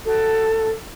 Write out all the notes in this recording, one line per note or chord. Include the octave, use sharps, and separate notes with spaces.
F#4 A4